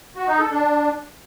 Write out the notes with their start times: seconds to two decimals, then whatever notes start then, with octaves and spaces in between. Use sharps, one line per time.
0.16 F#4
0.28 D#4
0.40 A4
0.51 D4